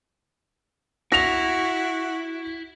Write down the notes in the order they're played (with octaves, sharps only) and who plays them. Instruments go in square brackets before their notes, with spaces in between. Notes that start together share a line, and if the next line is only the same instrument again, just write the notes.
[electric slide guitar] E4 [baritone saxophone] F#4 [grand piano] A#6 F7